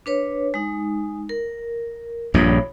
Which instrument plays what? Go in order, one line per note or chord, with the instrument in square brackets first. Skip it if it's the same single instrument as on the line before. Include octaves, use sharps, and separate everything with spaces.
[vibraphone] D4 B4 C#5
G#3 D#4
A#4
[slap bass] A#1 G2 A#2 [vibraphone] C#5 B5